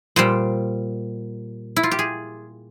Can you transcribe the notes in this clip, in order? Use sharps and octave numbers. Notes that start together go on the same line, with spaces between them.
A#2 G3 C5
E4
F4
G4
G#4